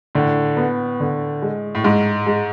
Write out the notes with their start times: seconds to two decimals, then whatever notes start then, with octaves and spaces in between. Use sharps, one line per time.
0.15 A2 D3
0.57 B3
1.00 D3
1.42 G#3
1.75 A2
1.84 G#2 G#3
2.27 G#3